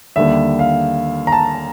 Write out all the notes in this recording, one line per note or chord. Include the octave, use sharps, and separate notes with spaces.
D#2 D3 G3 E5
F5
A#5
A5